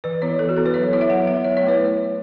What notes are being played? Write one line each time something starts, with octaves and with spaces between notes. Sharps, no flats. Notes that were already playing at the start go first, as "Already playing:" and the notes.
E3 B4
B3 E4 C#5
E3 A4
F#4
B3 E4 A4
B4
F#3 C#5
B3 E4 C#5
E5
F#3 F#5
B3 E4 E5
F#3 C#5
C#5
A3
E4 B4